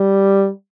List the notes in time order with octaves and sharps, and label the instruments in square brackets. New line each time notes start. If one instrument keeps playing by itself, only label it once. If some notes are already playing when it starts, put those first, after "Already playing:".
Already playing: [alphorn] G3